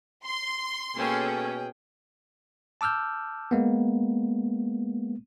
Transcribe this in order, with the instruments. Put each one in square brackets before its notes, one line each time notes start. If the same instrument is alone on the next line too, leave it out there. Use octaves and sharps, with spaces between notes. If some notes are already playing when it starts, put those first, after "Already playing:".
[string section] C6
[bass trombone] B2 [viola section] A#3 C#4 A4 [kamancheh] G#4 G5
[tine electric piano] A5 D6 E6 F6 G6
G#3 A#3 B3